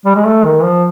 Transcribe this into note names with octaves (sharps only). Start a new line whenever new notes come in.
G3
G#3
A3
D#3
F3